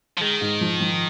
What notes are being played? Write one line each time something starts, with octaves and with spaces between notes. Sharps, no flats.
F3
D#3 G#3
G#2
F3
F3